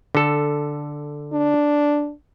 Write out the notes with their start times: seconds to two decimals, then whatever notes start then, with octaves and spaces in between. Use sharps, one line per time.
0.15 D3 A4
1.33 D4